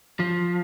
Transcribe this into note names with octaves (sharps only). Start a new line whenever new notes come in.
F3